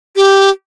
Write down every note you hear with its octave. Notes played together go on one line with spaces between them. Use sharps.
G4